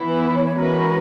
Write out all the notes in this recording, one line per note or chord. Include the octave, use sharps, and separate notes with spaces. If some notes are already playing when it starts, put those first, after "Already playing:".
Already playing: E3 B3 E4
B4
B4
C#5
C#5
E3 G#3 C#4 F#4 A#4 B4